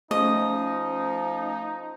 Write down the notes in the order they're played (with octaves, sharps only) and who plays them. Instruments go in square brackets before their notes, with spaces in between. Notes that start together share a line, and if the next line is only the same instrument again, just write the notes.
[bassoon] F3 [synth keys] A3 C#4 [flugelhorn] D#4 [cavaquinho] D#5